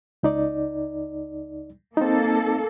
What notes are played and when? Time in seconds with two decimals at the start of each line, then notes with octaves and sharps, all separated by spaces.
0.23 C#2 D#4 D5
1.97 A#3 C4 D#4 A4